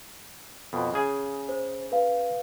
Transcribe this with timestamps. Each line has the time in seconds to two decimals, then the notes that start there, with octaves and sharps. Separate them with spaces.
0.73 F2 B2
0.94 C#3 G#4
1.49 C5
1.92 B4 F5